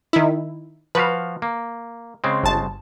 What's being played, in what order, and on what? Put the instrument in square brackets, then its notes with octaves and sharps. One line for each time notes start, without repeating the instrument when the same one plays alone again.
[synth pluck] D#3 E4
[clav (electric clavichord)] F3 F#4 F5 [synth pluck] B4
[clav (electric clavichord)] A#3
C#3 G#3 C4
[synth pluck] G1 A5